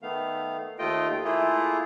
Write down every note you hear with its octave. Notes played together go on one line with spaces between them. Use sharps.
D#3 A3 B3 F5
D#2 A3 F4 D#5 G5
A3 A#3 E4 F4 G#4